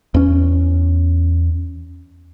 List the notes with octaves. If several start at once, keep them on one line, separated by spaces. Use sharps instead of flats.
E2 C#4